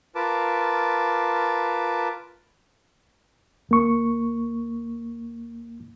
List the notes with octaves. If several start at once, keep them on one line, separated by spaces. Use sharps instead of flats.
F4 A#4 B4 A5 D6
D2 A#3 C#6